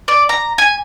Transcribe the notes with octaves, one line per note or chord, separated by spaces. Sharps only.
D5
A#5
G#5